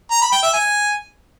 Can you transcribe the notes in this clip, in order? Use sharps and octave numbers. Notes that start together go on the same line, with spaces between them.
A#5
B5
G5
E5
G#5